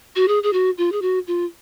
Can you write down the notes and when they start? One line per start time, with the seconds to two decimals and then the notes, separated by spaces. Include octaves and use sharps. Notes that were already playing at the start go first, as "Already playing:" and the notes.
0.16 F#4
0.28 G#4
0.43 G#4
0.53 F#4
0.78 F4
0.92 G#4
1.02 F#4
1.27 F4